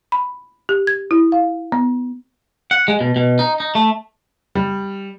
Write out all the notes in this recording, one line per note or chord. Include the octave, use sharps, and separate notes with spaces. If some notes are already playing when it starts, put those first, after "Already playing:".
B5
G4
G#6
E4
F5
B3
F#5
G#3
B2
B2
D#4
D#4
A3
G3